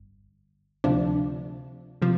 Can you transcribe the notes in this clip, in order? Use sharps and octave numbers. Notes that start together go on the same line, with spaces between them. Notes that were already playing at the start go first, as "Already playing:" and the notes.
Already playing: G1
D2 C3 F3 D4
C3 F3